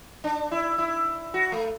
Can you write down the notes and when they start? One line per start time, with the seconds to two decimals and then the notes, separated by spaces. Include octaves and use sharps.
0.24 D4
0.51 E4
0.78 E4
1.34 F#4
1.52 A3